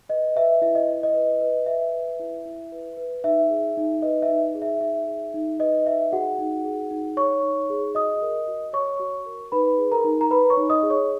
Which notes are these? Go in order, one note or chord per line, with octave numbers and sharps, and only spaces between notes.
B4 D#5
B4 E5
E4 E5
D#5
E4
D#5
B4
B4
B4 E5
B4
E4
E4
B4
B4
D#4 E5
G#4
D#4
B4 D#5
E5
D#4
G#4
E5
D#4 E5
G#4
D#4
B4 D#5
D#4 E5
F#4 G#4 F#5
D#4
G#4
D#4
C#5 C#6
D#4
G#4
F#4 D#5 D#6
A#4
F#4
C#5 C#6
F#4
A#4
D#4 B4 B5
G#4
A#4 A#5
D#4
A#5
B4 B5
C#5 C#6
D#4
D#5 D#6
G#4
C#5 C#6